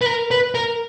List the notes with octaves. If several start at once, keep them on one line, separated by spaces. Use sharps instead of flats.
B4
A#4
B4
A#4